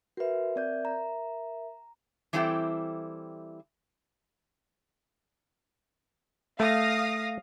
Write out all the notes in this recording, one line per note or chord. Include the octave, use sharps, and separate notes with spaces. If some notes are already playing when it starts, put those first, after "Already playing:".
F#4 A#4 B4 E5
C4 D5 G6
A#5
E3 G3 C4 E4 A4 G5
A3 F5 D#6 A#6